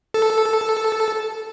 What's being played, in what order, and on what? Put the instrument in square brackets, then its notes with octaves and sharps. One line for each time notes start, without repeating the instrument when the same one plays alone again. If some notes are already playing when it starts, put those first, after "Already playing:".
[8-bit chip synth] A4